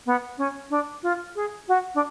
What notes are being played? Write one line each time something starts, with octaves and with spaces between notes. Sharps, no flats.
B3
C#4
D4
F4
G#4
F#4
D4